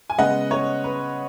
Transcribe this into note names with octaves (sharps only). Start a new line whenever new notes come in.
G#5
C#3 G#3 B3 D#5 F#5
C#5
B4